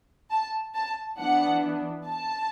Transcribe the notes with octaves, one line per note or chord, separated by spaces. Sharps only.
A5
A5
E3 B3 D4 F#5
A5